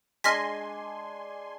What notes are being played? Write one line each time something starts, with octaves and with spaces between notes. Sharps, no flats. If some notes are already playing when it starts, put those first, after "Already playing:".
G#3 D4 G#5 C6 F6 A#6 B6